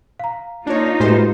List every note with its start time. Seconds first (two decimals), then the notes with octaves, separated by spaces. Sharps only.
0.20 F5 A#5
0.67 A#3 D4 D#4 F4 C#5
1.00 A2 G#3 F#4 G4 B4 C5